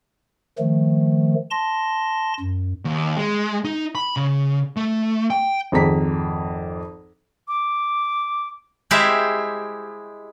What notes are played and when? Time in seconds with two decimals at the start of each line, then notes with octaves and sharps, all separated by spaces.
0.58 D#3 F3 A3
1.51 A5 C6 A#6
2.40 F#2
2.85 D#2
3.17 G#3
3.65 D#4
3.95 B5
4.17 C#3
4.77 A3
5.30 G5
5.72 G#1 F2 G#4 A#5 B6
7.48 D6
8.91 G#3 E4 G4 C5 E5 F5